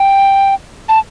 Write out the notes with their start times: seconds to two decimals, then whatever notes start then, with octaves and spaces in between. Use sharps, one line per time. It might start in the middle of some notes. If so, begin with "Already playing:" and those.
Already playing: G5
0.89 A5